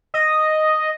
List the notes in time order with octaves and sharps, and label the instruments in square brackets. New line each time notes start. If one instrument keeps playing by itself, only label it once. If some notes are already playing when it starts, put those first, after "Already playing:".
[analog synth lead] D#5